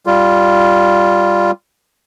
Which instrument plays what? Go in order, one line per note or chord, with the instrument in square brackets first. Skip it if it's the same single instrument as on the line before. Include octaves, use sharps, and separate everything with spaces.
[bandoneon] G3 F4